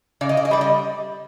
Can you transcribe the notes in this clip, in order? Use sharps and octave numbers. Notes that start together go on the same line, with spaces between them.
C#3 D5
D#5
D5
D#5
G3 D5
D#5